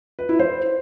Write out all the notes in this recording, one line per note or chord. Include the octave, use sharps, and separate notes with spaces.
B4
E4
C5